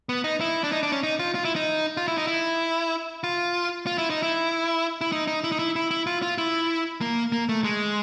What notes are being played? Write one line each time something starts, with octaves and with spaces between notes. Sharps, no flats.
B3
D#4
E4
D4
D#4
D4
C#4
D#4
F4
F4
E4
D#4
F4
E4
D#4
E4
F4
F4
E4
D#4
E4
E4
D#4
D#4
E4
D#4
E4
E4
E4
F4
F4
E4
A#3
A#3
A3
G#3